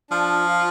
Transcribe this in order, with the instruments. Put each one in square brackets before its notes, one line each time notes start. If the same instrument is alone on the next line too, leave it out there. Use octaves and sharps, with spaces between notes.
[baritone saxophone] F3 [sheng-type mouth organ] D4
[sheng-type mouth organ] F4